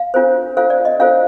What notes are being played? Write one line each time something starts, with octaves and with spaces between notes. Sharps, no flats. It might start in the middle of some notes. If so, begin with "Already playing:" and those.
Already playing: F5
D4 F4 A4 C5
D4 F4 A4 C5 F5
D5
D#5
D4 F4 A4 C5 F5